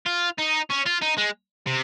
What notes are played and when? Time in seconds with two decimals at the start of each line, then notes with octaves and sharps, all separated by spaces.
0.06 F4
0.38 D#4
0.70 C#4
0.86 F4
1.02 D#4
1.18 G#3
1.67 C3